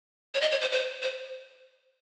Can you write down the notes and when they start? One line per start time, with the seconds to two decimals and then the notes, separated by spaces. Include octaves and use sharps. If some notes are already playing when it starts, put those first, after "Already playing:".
0.34 C#5
0.41 D#5
0.52 C#5
0.61 C5
0.72 C5
1.02 C5